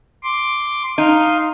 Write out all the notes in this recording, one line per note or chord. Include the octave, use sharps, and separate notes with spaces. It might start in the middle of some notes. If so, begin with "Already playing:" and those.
C6 D6
D#4 F5 C6